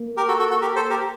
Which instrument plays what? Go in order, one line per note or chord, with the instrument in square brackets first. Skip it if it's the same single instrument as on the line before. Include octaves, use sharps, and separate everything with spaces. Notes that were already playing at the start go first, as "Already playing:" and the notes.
Already playing: [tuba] A#3
[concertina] G4 A#4
F#4 A4
F#4 A4
F#4 A4
G4 A#4
A4 C5
G4 A#4